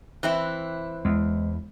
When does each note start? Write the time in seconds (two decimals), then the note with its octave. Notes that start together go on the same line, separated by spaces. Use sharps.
0.23 E3 C4 E4 F#6
1.05 E2 G#3